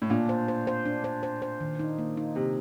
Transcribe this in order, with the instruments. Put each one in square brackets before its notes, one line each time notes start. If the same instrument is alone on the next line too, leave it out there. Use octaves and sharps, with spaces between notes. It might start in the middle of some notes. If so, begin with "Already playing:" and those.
[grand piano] A2
[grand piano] A#2 [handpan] D4
[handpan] C5
C5
C5
D4
C5
C5
C5
D#3
D#4
A#3
D#4
[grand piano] C3 [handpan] A#3